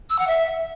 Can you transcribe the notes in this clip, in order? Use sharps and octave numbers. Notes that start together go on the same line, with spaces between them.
E6
F#5
E5